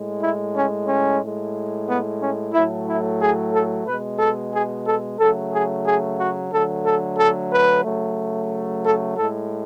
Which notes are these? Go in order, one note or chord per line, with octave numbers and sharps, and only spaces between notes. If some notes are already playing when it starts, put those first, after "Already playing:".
Already playing: A2 G#3
E4
C#4
C#4
A2 G#3
B3
C#4
A2 F#3 A3 E4
E4
G#4
A4
B2 G#3 B4
A4
G#4
A4
C#3 F#3 A3 A4
G#4
G#4
F#4
D3 F#3 A3 A4
A4
A4
B4
C#3 F#3 A3
A4
A2 G#3 A4